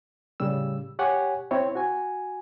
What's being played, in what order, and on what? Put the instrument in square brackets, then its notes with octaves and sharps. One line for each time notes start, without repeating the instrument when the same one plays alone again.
[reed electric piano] A2 C#3 G3 E6
G4 C#5 F#5 G#5
C4 E4 C#5
F#4 G#5